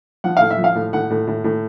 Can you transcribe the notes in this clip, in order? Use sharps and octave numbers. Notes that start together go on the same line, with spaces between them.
F3 F#5
A2 F5
E5
F3
F5
A2
A2 F#5
A2
A2
A2